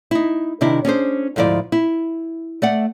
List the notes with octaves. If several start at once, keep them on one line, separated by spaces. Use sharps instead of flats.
D#4 E4
C3 D#3 D4 E4
C#4 D4 G#4 C5
D2 G#2 F3 E4 D5
E4
A3 D5 F#5